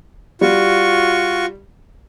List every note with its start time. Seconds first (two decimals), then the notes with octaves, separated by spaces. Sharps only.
0.41 G3 F4 F#4 C#6